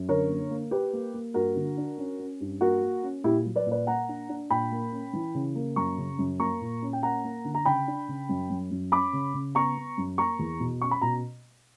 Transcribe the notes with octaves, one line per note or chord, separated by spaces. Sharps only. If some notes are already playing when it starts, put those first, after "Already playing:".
Already playing: F#2
D3 A#4 C#5
A#3
A#3
A#3 G4 B4
A#3
A#3
G2 F#4 A#4
D3
D4
C#4
C#4
G2
A#3 F#4 A#4
A#3
C#4
A#2 E4 G4
F#3
B4 D5
A#2
B4 D5
A#3 F#5 A#5
D4
D4
A#2 G5 B5
A#3
C#4
E3
C#3
A#3
F#2 A#5 C#6
C#3
F#2
A#3 A#5 C#6
A#2
C#4
G5
A#3 F#5 A#5
A#3
D3
A#5
C#3 G5 B5
D4
C#3
F#2
F#2
F#2
C#4 B5 D6
C#3
C#3
B3 A#5 C#6
B3
F#2
A#3 A#5 C#6
E2
B2
C#4 C#6
B5
B2 A#5